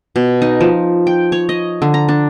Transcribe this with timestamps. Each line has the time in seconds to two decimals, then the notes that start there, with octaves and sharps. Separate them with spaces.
0.16 B2
0.42 D#4
0.61 F3
1.07 G5
1.32 C#5
1.49 D#5
1.82 D3
1.94 A#5
2.09 D4